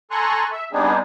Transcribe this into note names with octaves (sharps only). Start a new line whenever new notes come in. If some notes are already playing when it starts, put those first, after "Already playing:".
A4 G#5 A#5 C6 C#6 F#6
E5
G3 B3 C4 D4 D#4 G#4